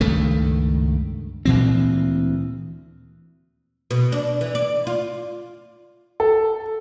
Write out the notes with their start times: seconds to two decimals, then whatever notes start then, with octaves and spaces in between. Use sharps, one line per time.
0.01 C#2 G2 D#3 A3
1.45 D2 A#2 E3 C4
3.91 B2
4.12 D4
4.41 E3
4.55 D5
4.87 F4
6.20 A4